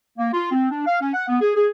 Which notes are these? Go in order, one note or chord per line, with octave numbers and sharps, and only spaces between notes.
A#3
F4
C4
D4
F5
C#4
F#5
B3
G#4
G#4